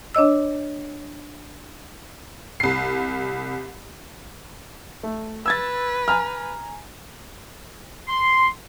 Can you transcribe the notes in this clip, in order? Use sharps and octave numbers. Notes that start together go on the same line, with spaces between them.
D4 C#5 D#5 E6
C2 C7
A3
B4 E6 G#6 A6
G#5 A#5 F6
C6